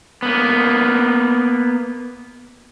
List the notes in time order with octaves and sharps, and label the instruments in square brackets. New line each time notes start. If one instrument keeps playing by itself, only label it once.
[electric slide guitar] A#3 B3